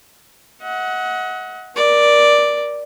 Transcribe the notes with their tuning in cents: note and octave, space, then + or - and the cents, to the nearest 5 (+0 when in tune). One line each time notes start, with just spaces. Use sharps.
D#5 +40 F#5 +0
A#4 +30 D5 +0